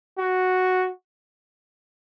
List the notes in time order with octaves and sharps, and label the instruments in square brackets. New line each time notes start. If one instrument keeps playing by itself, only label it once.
[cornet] F#4